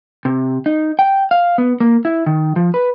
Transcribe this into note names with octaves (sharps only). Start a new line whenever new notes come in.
C3
D#4
G5
F5
B3
A#3
E4
D#3
F3
B4